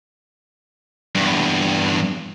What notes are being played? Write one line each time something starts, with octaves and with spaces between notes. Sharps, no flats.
E2 G2